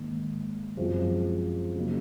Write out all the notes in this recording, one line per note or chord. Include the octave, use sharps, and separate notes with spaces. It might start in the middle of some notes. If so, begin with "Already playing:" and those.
Already playing: G#2 D#3 A#3
F#2 F3 G#3 C4 F4
C#3 F#3 A#3 D#4